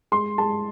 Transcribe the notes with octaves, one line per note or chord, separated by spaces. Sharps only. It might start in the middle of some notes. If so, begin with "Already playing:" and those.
G#3 C6
G#3 A5